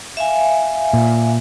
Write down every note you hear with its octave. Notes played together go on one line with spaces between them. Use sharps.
E5 F5 G#5
A#2